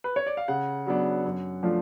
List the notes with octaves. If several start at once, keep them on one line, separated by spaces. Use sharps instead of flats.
B4
C#5
D5
F5
C#3 F#5
F#3 B3 D4
F#2
F3 A3 D4 F4